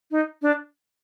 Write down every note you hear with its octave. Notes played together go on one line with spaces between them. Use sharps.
D#4
D4